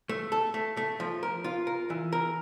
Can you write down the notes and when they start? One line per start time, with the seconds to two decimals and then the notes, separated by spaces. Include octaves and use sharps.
0.09 A3
0.32 A4
0.54 A3
0.77 A3
1.00 F3
1.23 A#4
1.44 F4
1.67 A#4
1.90 E3
2.13 A#4